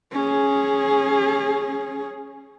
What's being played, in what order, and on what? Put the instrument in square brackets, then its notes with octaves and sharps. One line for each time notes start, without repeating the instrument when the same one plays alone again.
[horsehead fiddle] C#4 G#4